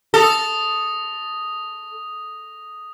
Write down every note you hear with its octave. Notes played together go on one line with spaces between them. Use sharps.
A4 D#6 A#6